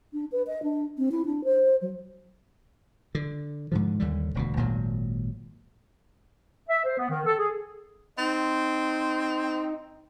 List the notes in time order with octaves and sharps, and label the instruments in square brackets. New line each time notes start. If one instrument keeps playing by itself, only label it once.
[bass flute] D4
B4
D#5
D4
C4
E4
D4
C5
F#3
[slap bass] D3
G#2 D3 F3
D#2 D3 G3
E1 D2 B2
G#1 A#2 D#3 F#3
[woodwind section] E5
C5
B3
D#3
A4
G#4
[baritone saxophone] C4 [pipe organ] D#4